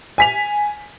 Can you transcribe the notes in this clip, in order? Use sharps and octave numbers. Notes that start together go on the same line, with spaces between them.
G#5 B6 F7